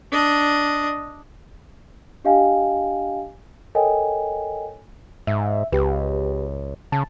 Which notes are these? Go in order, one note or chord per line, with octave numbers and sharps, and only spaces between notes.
D4 D#5
D4 G4 D#5 F5 G5 G#5
A4 A#4 C#5 D#5 G5 G#5
G#2 E5
C#2 G4 B4
C#3 A5